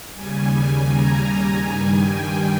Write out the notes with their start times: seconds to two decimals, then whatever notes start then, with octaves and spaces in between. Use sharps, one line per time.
0.14 D#2 C#3 G3 G#5
0.51 G#5
0.89 A#5
1.26 G#5
1.64 G2 D#3 G3
2.01 G5